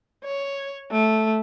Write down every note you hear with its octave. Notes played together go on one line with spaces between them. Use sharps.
C#5
A3